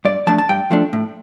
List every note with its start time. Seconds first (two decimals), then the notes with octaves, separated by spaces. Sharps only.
0.05 G2 D5
0.27 F3 A3 D4 A5
0.38 A5
0.49 G2 G5
0.71 F3 A3 D4
0.93 A2